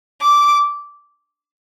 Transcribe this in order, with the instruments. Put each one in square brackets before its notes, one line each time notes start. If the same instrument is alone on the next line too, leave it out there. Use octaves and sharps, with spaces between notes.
[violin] D6